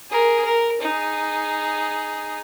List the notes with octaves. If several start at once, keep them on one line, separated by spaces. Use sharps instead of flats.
G#4 A#4
A#4
D#4 G#4